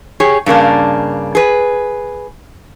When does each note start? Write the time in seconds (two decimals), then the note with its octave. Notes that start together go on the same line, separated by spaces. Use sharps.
0.20 G4 G#4 C#5
0.46 G2 C#3 A#3 D4
1.35 G#4 B4